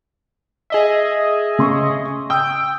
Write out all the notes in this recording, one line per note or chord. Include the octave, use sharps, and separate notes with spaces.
G#4 D#5 E5
C#3 C6 C#6
G5 D#6 E6